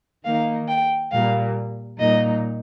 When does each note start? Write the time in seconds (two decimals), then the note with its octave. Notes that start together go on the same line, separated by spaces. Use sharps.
0.25 D#3 A#3 D#4 F5
0.68 G5
1.12 A#2 G3 A#3 F5
1.99 A#2 G3 A#3 D#4 D#5